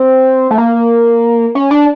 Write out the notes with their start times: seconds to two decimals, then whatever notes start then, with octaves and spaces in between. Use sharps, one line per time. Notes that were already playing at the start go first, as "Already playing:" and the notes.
Already playing: C4
0.51 A3
0.58 A#3
1.55 C#4
1.71 D4